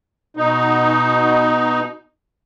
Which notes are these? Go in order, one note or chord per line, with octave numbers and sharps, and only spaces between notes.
B2 D#4